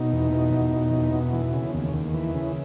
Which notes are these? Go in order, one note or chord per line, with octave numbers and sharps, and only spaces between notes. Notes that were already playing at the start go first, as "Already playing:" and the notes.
Already playing: B2 D#4
E2
B2
E2
B2
E2
B2
E3
C#3
D#2
D#2
E3
C#3